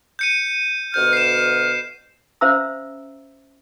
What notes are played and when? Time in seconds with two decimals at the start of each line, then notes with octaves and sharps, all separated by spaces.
0.19 G6 C#7 D#7
0.94 D2 B2 F6 G6
1.13 C7 E7
2.41 C#4 C5 E5 F5 A#5 E6